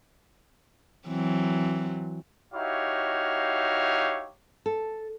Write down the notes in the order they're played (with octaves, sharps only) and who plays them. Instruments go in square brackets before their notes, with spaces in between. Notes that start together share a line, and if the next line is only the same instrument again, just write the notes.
[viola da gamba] E3 F#3 C4
[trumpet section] D#4 E4 F#4 G4 C#5 F5
[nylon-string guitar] A4